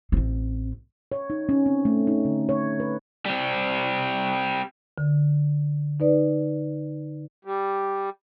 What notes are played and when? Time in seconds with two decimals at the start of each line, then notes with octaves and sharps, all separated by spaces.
0.12 A1 C4
1.12 C#5
1.30 D#4
1.49 C#4
1.66 C4
1.85 A3
2.07 D#4
2.25 D3
2.49 C#5
2.80 B4
3.26 G3 C4
4.98 D3
6.00 D#4 B4 D5
7.45 G3